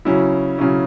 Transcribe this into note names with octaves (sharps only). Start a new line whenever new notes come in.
C#3 F#3 C#4 E4
C#3 F#3 C#4 E4